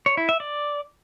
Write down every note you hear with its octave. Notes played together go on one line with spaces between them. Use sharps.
C#5
E4
E5
D5